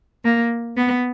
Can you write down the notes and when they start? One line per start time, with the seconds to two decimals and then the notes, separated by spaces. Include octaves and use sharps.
0.24 A#3
0.76 B3